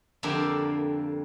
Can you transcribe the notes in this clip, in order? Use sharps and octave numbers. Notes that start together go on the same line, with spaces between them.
F2 D3 A#3 D4 G4 E5